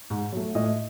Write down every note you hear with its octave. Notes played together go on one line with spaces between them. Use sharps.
G#2
F#3 A3
A2 D#5